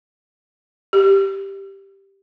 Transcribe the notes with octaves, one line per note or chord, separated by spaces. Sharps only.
G4